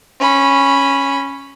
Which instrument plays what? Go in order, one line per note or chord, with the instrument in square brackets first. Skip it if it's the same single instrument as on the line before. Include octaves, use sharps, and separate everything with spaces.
[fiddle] C#4 B5